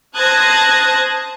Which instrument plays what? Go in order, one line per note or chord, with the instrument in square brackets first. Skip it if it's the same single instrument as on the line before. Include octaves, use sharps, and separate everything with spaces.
[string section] C5 A5 D#6 F#6 G#6 A#6